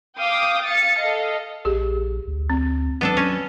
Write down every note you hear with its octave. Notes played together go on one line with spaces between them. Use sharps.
F5 G5 D6 D#6
F5 A6 C#7
A4 D#5 F5
A#1 G4 G#4
D2
C4
F#3 B3 D4 A4
C#4